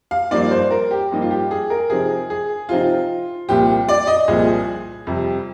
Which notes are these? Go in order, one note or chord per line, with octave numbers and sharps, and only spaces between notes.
F5
G2 F3 A#3 D#4 D5
C5
A#4
G4
G2 F3 A#3 D#4
F4
G4
G#4
A#4
C3 F3 C4 D#4 G#4
G#4
C3 F3 C4 D#4 F4
C2 A#2 F3 G4
D5
D#5
C2 A#2 F3 G#4
F2 C3 G3